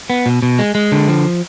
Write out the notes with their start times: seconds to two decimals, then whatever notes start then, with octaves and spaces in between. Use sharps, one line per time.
0.10 B3
0.26 B2
0.42 B2
0.59 G#3
0.75 G#3
0.92 D3
1.08 F3